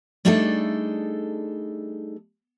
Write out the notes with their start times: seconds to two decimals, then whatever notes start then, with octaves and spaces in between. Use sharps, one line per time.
0.25 G3 A3 D4 D#4 G#4 A4